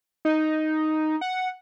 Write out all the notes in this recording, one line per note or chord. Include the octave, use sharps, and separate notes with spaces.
D#4
F#5